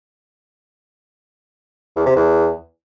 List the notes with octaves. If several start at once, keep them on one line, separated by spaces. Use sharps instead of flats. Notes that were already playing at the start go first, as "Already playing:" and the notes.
E2
C3
E2